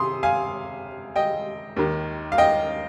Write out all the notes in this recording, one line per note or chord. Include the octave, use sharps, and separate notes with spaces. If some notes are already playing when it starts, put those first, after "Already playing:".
Already playing: C3 C6 D#6
F5 G#5
D#5 G5
D#2 D#3
F5
D#5 G5